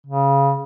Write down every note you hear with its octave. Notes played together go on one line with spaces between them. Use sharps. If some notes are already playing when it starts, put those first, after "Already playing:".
C#3